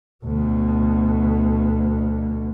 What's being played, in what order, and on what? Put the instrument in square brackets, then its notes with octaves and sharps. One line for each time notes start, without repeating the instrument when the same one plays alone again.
[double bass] D2 B2